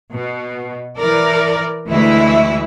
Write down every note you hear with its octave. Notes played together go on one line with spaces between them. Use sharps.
B2
E3 A#4 D5
D2 E3 G#3 A3 E4 E5